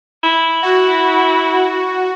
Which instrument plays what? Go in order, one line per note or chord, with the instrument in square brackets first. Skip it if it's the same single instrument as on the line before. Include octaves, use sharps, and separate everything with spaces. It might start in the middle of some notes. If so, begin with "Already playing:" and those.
[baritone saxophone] E4
[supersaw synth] F#4